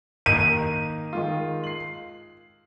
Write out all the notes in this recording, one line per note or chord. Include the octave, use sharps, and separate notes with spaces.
D#3 A#3 D#4 D#7
D#3 G#3 F4
C7 F#7